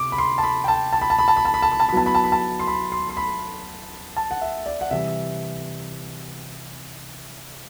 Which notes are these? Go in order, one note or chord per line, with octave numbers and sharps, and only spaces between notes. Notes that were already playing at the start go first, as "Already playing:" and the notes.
Already playing: C3 D6
B5
C6
A5
B5
G5
A5
A5
B5
A5
B5
A5
B5
A5
B5
A5
B5
A5
B5
F#3 B3 E4 A5
B5
A5
B5
A5
C6
B5
C6
C6
B5
A5
F#5
E5
D5
F#5
C3 E3 G3 E5